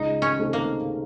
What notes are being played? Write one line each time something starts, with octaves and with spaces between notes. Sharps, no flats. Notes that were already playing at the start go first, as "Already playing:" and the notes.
Already playing: C#2 D#4
C#4
C3 D#3 A3 C4
A#3